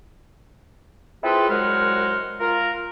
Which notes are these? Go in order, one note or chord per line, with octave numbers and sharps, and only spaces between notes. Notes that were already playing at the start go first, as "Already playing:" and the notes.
C4 E4 F4 G#4 A4 B4
C2 F#3 G#3 A#4 F#5 F6
F4 A#4